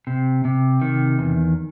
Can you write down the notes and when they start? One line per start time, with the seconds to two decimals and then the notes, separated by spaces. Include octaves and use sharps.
0.07 C3
0.45 C3
0.82 D#3
1.19 E2